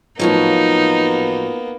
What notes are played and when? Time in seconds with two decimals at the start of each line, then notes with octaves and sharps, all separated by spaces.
0.19 A2 F3 F#3 A#3 B3 D#4